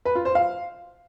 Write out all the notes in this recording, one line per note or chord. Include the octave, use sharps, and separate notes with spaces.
B4
F4
C5
F5